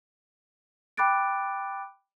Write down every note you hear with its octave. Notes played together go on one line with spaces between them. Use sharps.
G5 B5 D6 F#6 A6 D7